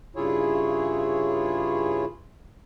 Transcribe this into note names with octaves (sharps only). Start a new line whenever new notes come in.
G2 C#3 E4 F4 G#4 C#5